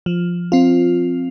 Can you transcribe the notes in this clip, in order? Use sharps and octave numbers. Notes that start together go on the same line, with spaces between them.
F3
C4 F4